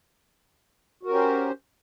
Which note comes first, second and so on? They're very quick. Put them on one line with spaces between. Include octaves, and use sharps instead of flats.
F#4 A#4 C#4 G4 C5